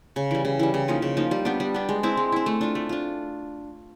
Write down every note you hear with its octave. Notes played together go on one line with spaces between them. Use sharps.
C#3
E3 G3
C#3
E3 G3
C#3
F3 A#3 D#4
C#3
F3 A#3 D#4
G3
B3 D4 G4
G3
B3 D4 G4
G#3
C4 E4
G#3
C4 E4
A3
D4 F4
A3
D4 F4